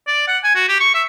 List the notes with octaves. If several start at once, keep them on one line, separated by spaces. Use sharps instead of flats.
D5
F#5
G#5
F#4
G4
C#6
E5